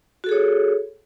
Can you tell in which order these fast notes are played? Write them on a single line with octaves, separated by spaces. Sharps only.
F#4 A4 G#4 C#5